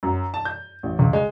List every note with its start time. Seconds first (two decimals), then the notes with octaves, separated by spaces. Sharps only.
0.03 F#2
0.34 A5
0.45 G6
0.83 A1
0.99 C#2
1.13 G#3